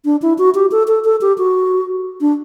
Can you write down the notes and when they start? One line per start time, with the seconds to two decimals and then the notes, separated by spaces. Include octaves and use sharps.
0.05 D4
0.22 E4
0.38 F#4
0.55 G4
0.72 A4
0.88 A4
1.05 A4
1.21 G4
1.38 F#4
2.21 D4